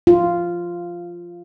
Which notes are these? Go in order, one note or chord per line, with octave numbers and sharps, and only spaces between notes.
F4